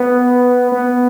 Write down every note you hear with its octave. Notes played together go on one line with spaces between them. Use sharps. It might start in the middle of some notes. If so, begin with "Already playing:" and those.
Already playing: B3
B3